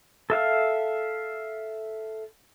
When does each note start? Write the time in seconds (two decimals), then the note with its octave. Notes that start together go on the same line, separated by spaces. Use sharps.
0.30 A4 E5 F5